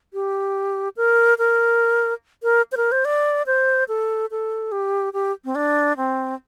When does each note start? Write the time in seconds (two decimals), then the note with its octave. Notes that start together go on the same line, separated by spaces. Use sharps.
0.14 G4
0.97 A#4
1.38 A#4
2.43 A#4
2.72 C5
2.77 A#4
2.92 C5
3.05 D5
3.46 C5
3.88 A4
4.31 A4
4.72 G4
5.13 G4
5.45 C4
5.55 D4
5.97 C4